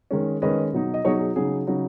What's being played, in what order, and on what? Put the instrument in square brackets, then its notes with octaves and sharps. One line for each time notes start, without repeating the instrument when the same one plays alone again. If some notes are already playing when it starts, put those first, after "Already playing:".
[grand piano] D#3 G#3 C#4
D#3 G#3 C#4 B4 D#5
B2 F#3 D#4
D#5
B2 F#3 D#4 G#4 C#5
G#4
C#3 F#3 D#4 G#4
C#3 F#3 D#4